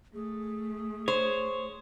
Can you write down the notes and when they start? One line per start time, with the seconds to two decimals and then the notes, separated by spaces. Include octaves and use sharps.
0.14 A3 G#4
1.08 C5 C#5